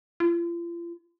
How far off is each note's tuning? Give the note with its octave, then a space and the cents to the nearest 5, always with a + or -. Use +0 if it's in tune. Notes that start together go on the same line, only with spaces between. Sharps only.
F4 -40